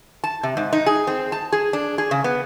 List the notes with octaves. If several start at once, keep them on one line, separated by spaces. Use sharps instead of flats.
A5
C3
G#2
D#4
G#4
C4
A5
G#4
D4
G#4
C#3
B3